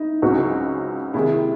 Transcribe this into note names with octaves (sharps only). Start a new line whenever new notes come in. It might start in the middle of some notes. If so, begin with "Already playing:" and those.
Already playing: D#4 E4
C#2 C#3 F#3 C4 F#4
C3 D#3 G#3 E4